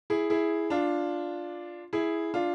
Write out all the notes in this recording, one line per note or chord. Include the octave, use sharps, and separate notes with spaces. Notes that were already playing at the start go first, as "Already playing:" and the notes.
E4 G#4
E4 G#4
D4 F4
E4 G#4
D4 F4